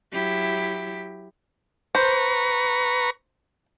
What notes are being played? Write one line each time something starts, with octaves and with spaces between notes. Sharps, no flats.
F#3 E4 G4
B4 C5 A#5 C#6